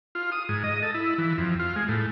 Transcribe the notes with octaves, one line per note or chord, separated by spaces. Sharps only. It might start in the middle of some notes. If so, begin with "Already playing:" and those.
F4
D#6
G#2
D#5
A4
E4
E3
F2
F4
G#3
A2